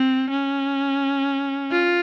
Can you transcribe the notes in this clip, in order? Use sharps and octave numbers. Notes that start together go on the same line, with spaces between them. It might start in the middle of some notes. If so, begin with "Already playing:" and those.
Already playing: C4
C#4
F4